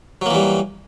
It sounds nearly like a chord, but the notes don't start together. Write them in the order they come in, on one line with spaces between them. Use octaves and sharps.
F#3 A#3 E3 G3